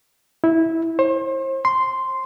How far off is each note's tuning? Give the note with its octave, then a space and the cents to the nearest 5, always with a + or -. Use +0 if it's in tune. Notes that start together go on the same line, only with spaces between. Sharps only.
E4 -15
C5 +40
C6 -5